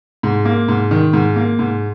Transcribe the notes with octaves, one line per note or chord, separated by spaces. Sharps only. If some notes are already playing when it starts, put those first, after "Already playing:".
G#2
A#3
G#2
D#3
G#2
A#3
G#2